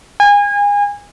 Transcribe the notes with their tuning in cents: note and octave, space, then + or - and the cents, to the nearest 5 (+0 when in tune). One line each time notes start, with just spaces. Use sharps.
G#5 -30